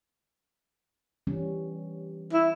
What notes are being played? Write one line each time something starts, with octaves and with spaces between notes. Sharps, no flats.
E3 G3 C#4
E4